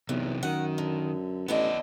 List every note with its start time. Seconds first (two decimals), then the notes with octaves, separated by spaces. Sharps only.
0.09 B1 E2 C3 E3
0.43 F#2 D#3 F#5
0.78 D3
1.48 A1 D3 B3 E4 D5 D#5